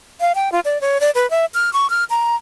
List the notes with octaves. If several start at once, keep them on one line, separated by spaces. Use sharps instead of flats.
F5
G5
F4
D5
C#5
D5
B4
E5
F6
C#6
F6
A#5